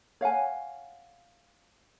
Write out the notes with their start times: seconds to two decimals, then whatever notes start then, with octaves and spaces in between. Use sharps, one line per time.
0.21 C#5 F5 F#5 G#5